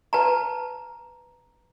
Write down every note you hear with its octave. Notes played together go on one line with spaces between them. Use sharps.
B4 A5 A#5